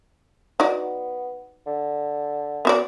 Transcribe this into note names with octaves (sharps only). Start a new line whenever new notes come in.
B3 D#4 F#4 D5
D3
B3 F#4 D5